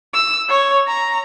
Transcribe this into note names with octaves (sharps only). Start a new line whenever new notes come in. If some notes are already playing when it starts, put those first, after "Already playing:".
E6
C#5
A#5